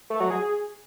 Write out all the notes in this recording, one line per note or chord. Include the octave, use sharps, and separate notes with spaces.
A3
F#3
G#4